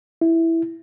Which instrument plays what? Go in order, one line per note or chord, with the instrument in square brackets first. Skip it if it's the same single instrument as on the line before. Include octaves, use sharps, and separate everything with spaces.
[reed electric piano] E4